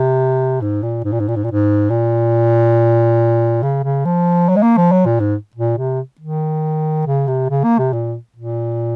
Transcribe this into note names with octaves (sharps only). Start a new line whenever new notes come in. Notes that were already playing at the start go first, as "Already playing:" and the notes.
Already playing: C3
G#2
A#2
G#2
A#2
G#2
A#2
G#2
A#2
G#2
A#2
C#3
C#3
F3
F#3
G#3
A#3
F3
F#3
A#2
G#2
A#2
C3
D#3
C#3
C3
C#3
A#3
C3
A#2
A#2